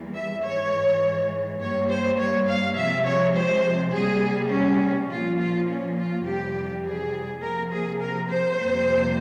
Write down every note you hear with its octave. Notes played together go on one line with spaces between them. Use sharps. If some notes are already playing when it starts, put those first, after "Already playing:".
Already playing: E2 E3 G3 A#3
E5
G#2 E3 G#3 C#5
G2 G3 A#3 C#5
C5
C#5
F5
C3 F3 G#3 E5
C#5
C5
C3 G3 A#3 G#4
C#4
A#2 F3 A#3 F4
F4
C#4
F4
F2 C3 E3 G3 G4
G#4
C3 F3 A#3 A#4
G#4
A#4
C5
F2 C3 G3 A#3